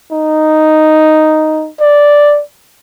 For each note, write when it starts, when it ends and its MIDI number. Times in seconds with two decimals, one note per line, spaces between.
0.12 1.69 63
1.80 2.42 74